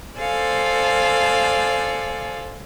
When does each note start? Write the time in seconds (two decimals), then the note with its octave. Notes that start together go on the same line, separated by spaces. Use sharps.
0.19 A4 C5 D5 F5 G#5